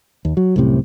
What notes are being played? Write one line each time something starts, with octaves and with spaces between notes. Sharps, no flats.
D#2
F#3
C2 F#2 A2 C3